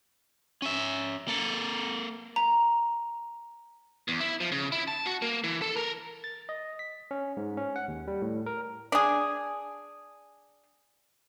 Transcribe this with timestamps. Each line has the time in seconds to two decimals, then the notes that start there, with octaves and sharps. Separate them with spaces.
0.62 C#4 E5
1.28 A#3 A4
2.36 A#5
4.08 E2
4.20 E4
4.40 F3
4.52 C#3
4.72 E4
4.88 A5
5.06 F#4
5.22 A#3
5.44 E3
5.62 A4
5.77 A#4
6.24 A6
6.49 D#5
6.79 B6
7.11 C#4
7.37 G#2
7.57 C#4
7.76 F#5
7.88 D#2
8.08 G3
8.22 A2
8.46 A#4
8.92 D4 G#4